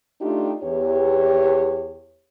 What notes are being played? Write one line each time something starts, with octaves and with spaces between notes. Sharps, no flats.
A3 D4 D#4 F4 G4
E2 G4 C#5